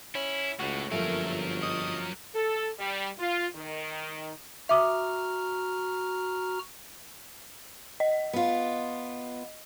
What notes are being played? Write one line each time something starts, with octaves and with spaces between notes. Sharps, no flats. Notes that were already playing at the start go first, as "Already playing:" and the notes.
C#4 E4
C#2 A2 F#4
G1 F#2 F3 F#3 A3 A#3 A#4
D#5
A4
G3
F4
D#3
F#4 E5 A#5 D6 D#6 F6
D#5
B3 F4